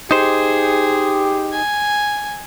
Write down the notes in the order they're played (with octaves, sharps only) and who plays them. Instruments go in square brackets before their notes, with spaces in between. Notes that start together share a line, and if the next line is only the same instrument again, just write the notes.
[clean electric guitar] D#4 C5 [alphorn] G4 [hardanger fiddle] G#4
[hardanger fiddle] G#5